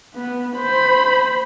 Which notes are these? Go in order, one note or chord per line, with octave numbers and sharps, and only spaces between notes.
B3
C5 B5